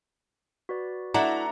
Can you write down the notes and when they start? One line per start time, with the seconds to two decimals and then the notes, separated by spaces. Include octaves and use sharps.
0.69 F#4 B4 D5
1.14 A3 D4 E4 F#5 A#5